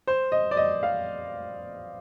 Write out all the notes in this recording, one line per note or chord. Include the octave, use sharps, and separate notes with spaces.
C5
D#5
D5
D#5
F5